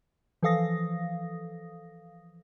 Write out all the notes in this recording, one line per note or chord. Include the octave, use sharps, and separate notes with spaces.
E3 F3 A4 F5 D#6 A#6